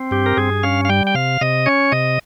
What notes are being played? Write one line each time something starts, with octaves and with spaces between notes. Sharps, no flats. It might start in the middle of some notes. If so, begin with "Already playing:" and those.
Already playing: C4
G2 G4
A#4
G2 G#4
C#4 F5
F5
G3 G5
G5
C3 F5
C3 D#5
C#4 C#5
C3 D#5